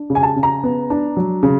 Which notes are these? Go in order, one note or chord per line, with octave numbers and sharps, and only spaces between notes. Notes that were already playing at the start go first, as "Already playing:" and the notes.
Already playing: D4
C#3
G#5
A5
C#3
A#5
B3
D4
F#3
C#3